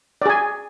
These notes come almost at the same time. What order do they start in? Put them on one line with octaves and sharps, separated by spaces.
D5 G#4 G#5